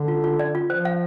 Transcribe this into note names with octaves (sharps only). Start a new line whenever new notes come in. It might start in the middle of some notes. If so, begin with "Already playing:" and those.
Already playing: D3
F4
F4
D5
F4
F3 C5
F5